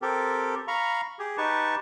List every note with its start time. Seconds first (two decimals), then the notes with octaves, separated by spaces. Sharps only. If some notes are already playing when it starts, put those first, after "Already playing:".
0.02 C4 G4 A4 A#4
0.68 F5 A#5 B5 C#6
1.19 G4 G#4
1.38 D#4 G4 B4 A5 C#6